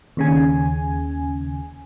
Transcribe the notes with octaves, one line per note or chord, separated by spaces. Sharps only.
D#2 C#3 G#5